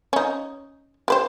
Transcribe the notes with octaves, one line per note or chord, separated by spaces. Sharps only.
C#4 D#4
G4 B4 C5